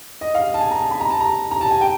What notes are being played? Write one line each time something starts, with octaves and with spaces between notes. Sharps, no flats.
D#5
F5
A5
G#5
A#5
A5
B5
A#5
A5
A#5
A#5
A5
G#5
G5